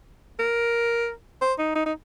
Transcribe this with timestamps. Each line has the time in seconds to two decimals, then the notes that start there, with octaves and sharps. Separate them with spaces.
0.39 A#4
1.41 C5
1.58 D#4
1.75 D#4
1.86 D#4